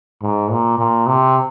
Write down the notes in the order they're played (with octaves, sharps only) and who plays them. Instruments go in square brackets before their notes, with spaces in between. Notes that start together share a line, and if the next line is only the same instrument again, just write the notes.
[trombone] G#2
A#2
A#2
C3